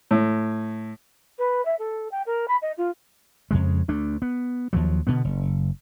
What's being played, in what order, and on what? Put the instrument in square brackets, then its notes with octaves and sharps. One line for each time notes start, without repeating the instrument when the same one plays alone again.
[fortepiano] A2
[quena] B4
E5
A4
G5
A#4
B5
D#5
F4
[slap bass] F2 C#3 G#3
D2 A3 D4
B3
D#2 F3 F#3
B2 D3 B3
F#1